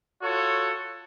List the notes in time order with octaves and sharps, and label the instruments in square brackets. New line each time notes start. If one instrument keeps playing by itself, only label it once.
[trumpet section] F4 F#4 A4 C#5